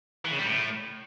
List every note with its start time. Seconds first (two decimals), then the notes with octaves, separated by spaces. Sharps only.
0.25 E3
0.32 C#3
0.39 G3
0.45 A2